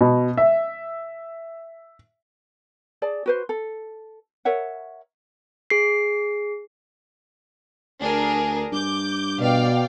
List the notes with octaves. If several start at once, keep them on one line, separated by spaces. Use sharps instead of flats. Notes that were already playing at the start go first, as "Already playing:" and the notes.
B2
E5
G#4 D5 A5
F#4 B4 C5
A4
A#4 C#5 E5 F#5
G#4 C7
D2 D4 G#4 A#4
G2 D6 G6
B2 D5 F5 G5